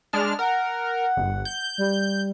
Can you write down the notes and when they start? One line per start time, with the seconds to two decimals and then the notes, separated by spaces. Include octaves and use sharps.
0.13 G#3 D4 F6
0.39 A#4 F#5
1.17 G1
1.45 G6
1.78 G3